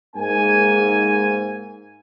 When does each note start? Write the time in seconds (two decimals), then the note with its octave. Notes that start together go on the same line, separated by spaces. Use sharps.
0.16 G#2 A#3 G#5